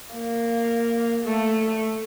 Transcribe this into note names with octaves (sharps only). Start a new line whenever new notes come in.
A#3
A3